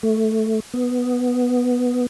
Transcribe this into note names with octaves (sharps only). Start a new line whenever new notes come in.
A3
B3